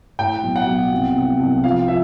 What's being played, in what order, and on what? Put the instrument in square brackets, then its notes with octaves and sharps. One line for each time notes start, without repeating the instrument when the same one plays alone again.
[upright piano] A2 [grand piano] G5
[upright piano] B1
[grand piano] F#5
[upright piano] B1
C2
C2
C2
[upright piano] F3 [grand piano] F5
[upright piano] F3 [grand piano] E5